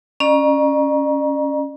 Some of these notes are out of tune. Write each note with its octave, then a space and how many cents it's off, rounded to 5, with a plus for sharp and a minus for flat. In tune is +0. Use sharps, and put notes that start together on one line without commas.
C#4 +0 D5 +45 A#5 +30